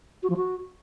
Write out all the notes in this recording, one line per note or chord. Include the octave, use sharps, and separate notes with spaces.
F#4
F3
F#4